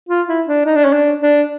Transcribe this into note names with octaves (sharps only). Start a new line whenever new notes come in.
F4
E4
D4
D#4
D4
C#4
D4
D4